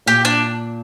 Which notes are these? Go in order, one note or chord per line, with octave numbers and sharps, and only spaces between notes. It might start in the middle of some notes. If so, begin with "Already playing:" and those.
A#2 G4
D4